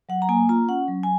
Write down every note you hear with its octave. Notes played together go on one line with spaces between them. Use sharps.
F#3 F#5
A#5
A#3 G#5
F4 A#5
C#4 F#5
F#3
G#5